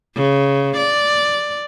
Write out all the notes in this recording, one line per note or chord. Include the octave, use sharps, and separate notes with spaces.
C#3
D5